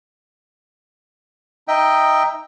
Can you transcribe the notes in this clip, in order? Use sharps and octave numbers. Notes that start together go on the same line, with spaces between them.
D#4 D#5 E5 G5